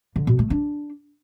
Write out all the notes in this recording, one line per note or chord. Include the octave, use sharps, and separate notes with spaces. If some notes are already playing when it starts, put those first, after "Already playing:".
D3
B2
A3
D4